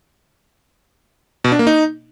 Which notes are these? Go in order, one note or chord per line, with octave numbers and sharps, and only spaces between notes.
B2
D4
A#3
D#4